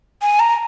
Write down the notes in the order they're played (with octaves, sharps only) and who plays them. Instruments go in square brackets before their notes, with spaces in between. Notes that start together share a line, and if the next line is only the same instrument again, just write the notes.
[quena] G#5
A#5